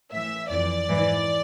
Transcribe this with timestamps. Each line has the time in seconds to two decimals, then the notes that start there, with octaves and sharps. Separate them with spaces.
0.12 A2 E3 E5
0.50 F2 E3 D5
0.88 G#2 E3